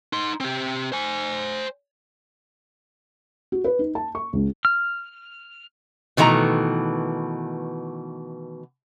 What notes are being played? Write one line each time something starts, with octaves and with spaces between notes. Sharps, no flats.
D#4 C6
C4 G4
C5 G#5
F#4
B4
D#4
A5
C#6
C#2
F6
B2 D#3 E3 A3 A#5